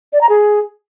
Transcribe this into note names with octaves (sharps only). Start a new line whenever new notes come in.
D5
A#5
G#4